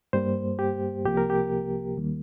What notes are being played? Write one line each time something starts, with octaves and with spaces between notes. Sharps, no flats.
G2 G3 A#3 C5
G4
C2 C3 F3 A#3 G4
A#4
G4
D#2 D#3 G3 A#3